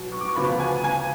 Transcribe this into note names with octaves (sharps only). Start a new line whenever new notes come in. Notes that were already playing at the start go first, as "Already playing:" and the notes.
Already playing: B2 F#3
C#6
D6
C#6
D2 C#3 F3 B3 B5
G#5
G#5